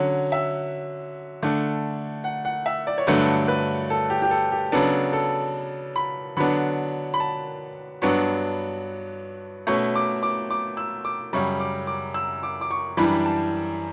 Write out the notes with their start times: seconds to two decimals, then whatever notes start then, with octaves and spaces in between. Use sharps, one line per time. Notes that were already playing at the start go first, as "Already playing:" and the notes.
Already playing: D3 F#3 C#4
0.32 E5
1.42 D3 A3 D4
2.24 F#5
2.45 F#5
2.66 E5
2.87 D5
2.98 C#5
3.07 G2 D3 F#3 A3 D4 B4
3.48 B4
3.90 A4
4.10 G4
4.22 G4
4.31 A4
4.52 G4
4.72 C#3 F#3 B3 D4 A4
5.13 A4
5.96 B5
6.37 D3 F#3 B3 D4 B5
7.14 B5
7.20 A5
8.02 G2 F#3 B3 D4 C#6
9.67 B2 A3 C#4 C#6
9.95 D6
10.23 D6
10.51 D6
10.77 E6
11.05 D6
11.33 F#2 C#3 G3 C#4 C#6
11.60 D6
11.87 D6
12.14 E6
12.43 D6
12.61 D6
12.71 C#6
12.97 F#2 E3 G3 D4 B5
13.25 A5